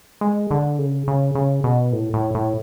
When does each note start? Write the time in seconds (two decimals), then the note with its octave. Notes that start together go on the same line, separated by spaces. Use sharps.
0.21 G#3
0.51 D3
0.79 C#3
1.08 C#3
1.35 C#3
1.64 B2
1.92 A2
2.14 A2
2.35 A2